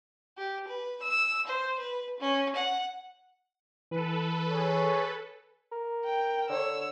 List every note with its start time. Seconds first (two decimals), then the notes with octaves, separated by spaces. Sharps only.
0.38 G4
0.68 B4
1.02 E6
1.47 C5
1.79 B4
2.20 C#4
2.55 F#5
3.91 E3 A4 B4
4.51 G#4 C#5
5.72 A#4
6.05 G5
6.49 D3 C#5 E6